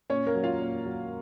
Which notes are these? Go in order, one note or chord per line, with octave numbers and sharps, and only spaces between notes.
A#2 C#4 C#5
A#3 A#4
F#3
F4 F5
A#2
F#3